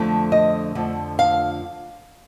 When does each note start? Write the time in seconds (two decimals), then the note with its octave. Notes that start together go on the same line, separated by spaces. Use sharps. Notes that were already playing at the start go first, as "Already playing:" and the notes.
Already playing: F2 D3 F3 A3
0.32 D#5
0.75 F2 D3 F3 A3
1.19 F5